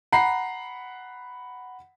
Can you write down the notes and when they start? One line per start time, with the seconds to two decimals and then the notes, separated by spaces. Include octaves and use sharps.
0.12 F#5 A#5 B5 C7